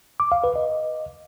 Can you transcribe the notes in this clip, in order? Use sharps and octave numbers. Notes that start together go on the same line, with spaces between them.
D6
F5
B4
D#5